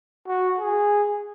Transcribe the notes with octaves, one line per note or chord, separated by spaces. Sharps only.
F#4
G#4